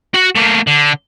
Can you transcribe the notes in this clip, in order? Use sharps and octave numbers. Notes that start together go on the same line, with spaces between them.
F#4 F#5
A3 A#3
D3